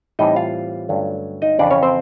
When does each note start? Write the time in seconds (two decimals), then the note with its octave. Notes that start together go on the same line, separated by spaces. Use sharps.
0.19 A2 E3 G3 C4 D#4 D#5
0.36 F4 F5
0.89 G2 D3 F#3 A3 C#4
1.42 D#4 D#5
1.59 F2 C#3 E3 D4 D5
1.71 C#4 C#5
1.83 C4 C5